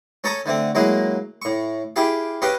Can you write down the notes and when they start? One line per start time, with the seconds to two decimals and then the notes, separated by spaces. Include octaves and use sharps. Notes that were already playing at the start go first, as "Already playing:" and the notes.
0.24 C#4 A4 C#5 A#5 C#6 D#6
0.46 D3 A3 C4
0.75 F#3 G#3 A#3 E4 G#4
1.42 A2 C#6
1.96 E4 G4 G#4 E5 F5
2.42 C#4 G4 B4 C#5 D#5 F5